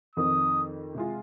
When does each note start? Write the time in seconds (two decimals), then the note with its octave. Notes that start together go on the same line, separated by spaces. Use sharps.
0.16 F2 D#3 C4 D#4 D#6
0.95 C3 G#3 F4